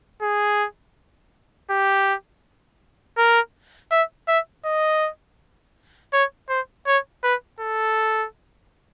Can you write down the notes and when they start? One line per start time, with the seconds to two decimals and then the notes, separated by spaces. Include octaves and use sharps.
0.22 G#4
1.70 G4
3.18 A#4
3.91 E5
4.28 E5
4.65 D#5
6.13 C#5
6.49 C5
6.87 C#5
7.24 B4
7.60 A4